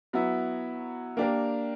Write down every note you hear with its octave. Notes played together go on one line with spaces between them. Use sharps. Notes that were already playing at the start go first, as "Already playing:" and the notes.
F#3 B3 E4
A#3 D4 G4 A#4